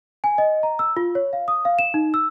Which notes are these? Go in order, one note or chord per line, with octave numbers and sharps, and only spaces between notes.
G#5
D#5
A#5
E6
F4
C#5
F5
D#6
F5
E7
D#4
E6